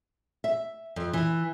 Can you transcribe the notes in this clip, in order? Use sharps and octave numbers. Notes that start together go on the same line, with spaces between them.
E5
F2
E3